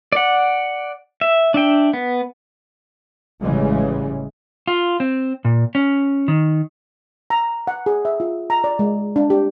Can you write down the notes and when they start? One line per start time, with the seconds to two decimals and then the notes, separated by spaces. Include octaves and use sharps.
0.13 D5 F#5
1.21 E5
1.54 D4 E5 G5
1.93 B3
3.42 A1 C#3 E3 G3 G#3
4.68 F4
5.00 C4
5.45 A#2
5.75 C#4
6.28 D#3
7.30 A#5
7.67 F#5
7.86 G#4
8.05 E5
8.20 F4
8.50 A#5
8.64 D5
8.79 G#3
9.16 D4
9.30 G4